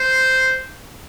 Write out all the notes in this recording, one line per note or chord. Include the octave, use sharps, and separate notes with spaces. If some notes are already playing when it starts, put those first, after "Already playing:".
Already playing: C5